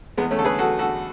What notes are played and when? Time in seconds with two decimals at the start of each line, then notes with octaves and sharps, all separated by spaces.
0.18 E2 G#3 B3
0.31 A3 C#4
0.39 D3 A4
0.45 G#4 B4
0.59 E2 F#4 A4
0.79 D3 F#4 A4